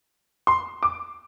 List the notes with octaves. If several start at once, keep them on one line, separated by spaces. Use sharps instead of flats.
C6
D6